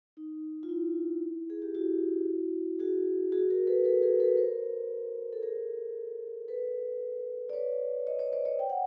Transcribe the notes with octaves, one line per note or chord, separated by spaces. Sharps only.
D#4
F4
E4
G#4
G4
E4 F#4
F#4 G#4
F#4 G#4
G#4 A#4
A4 B4
A4 B4
G#4 A#4
A4 B4
A#4 C5
A4
G#4 A#4
A4 B4
D5
B4 C#5
C#5 D#5
C#5 D#5
C5 D5
C#5 D#5
G5
F#5